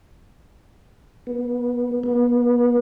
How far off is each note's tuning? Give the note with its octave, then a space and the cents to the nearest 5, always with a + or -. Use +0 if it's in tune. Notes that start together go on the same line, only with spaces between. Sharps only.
B3 -25
B3 -35